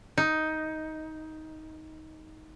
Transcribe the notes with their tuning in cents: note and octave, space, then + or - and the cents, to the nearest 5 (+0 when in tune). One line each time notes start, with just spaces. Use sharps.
D#4 +10